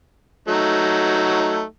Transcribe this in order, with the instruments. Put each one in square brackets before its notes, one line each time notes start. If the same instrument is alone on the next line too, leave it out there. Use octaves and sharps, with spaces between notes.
[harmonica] F#3 A3 D#4